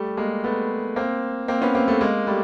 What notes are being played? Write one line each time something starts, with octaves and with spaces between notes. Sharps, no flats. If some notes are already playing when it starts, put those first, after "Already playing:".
Already playing: G3 A3
G#3 A#3
A3 B3
A#3 C4
A#3 C4
B3 C#4
A#3 C4
A3 B3
G#3 A#3
G3 A3